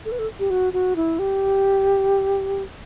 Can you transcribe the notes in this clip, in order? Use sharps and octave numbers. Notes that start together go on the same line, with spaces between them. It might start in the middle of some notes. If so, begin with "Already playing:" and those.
A4
B4
A4
G4
F#4
F#4
E4
G4